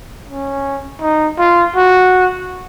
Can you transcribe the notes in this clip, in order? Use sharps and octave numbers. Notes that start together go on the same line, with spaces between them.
C#4
D#4
F4
F#4